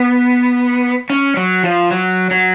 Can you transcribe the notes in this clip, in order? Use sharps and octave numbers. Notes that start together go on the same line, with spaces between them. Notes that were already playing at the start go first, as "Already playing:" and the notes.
Already playing: B3
C#4
F#3
F3
F#3
F#3